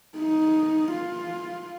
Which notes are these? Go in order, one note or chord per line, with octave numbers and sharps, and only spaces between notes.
D#4
F4